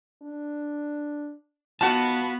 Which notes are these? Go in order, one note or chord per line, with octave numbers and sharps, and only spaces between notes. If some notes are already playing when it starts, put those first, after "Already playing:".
D4
D#3 B3 F4 F#4 A5